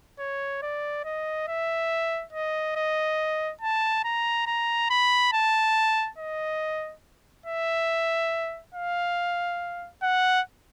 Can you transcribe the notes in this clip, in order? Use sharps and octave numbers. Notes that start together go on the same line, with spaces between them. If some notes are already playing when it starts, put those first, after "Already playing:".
C#5
D5
D#5
E5
D#5
D#5
A5
A#5
A#5
B5
A5
D#5
E5
F5
F#5